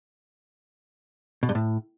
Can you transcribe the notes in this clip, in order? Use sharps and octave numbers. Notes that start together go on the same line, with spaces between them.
B2
G2
A2